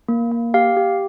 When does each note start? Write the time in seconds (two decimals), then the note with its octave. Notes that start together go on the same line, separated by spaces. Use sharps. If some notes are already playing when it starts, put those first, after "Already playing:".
0.08 A#3
0.32 A#3
0.54 G4 F5
0.77 G4